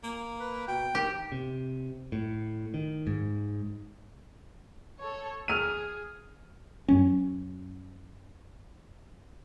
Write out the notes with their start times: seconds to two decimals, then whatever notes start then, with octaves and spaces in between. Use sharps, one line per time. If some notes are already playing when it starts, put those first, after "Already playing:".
0.03 A#3
0.40 B4
0.68 B2 G5
0.95 D#3 G4
1.32 C3
2.12 A2
2.74 D#3
3.07 G#2
5.00 A4 C#5
5.48 G#4 F6 D#7
6.88 F#2 F#3 C#4